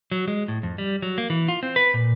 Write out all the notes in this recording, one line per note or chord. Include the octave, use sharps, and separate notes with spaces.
F#3
G#3
A2
F2
G3
F#3
A#3
E3
F4
C4
B4
A#2